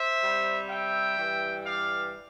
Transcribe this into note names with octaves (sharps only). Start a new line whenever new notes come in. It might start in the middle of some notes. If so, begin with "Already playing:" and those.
Already playing: C5 E5
C3 G3
E5 G5
G2 E3 G3
D5 F5